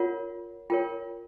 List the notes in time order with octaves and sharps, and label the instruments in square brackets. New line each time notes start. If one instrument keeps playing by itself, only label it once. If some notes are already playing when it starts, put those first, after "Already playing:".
Already playing: [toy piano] F4 A#4 C#5 F#5
F4 A#4 C#5 G5